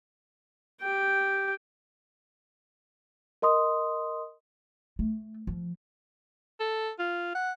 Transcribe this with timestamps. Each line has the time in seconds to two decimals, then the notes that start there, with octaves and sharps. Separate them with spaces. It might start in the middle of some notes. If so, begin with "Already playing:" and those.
0.81 G4 G5
3.42 A#4 D#5 C6 D#6
4.99 A3
5.47 F3
6.60 A4
6.99 F4
7.35 F#5